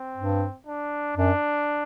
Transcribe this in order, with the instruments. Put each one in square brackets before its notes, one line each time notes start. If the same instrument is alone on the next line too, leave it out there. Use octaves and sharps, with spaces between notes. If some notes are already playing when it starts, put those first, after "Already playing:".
Already playing: [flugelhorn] C4
[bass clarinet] G2
[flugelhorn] D4
[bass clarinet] F#2 [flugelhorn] D4